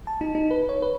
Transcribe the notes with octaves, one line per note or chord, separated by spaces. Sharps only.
A5
D#4
D#4
B4
C#5
B4